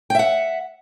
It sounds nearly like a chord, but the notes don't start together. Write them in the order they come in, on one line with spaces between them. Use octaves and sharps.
G5 E5 F#5